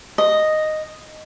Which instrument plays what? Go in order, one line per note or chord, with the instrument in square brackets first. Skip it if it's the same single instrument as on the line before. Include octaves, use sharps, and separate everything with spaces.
[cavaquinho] D#5